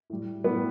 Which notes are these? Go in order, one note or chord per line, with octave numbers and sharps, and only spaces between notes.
A2 G3
A2 G3 B3